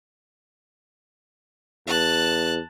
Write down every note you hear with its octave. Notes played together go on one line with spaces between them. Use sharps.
E2 A5 F#6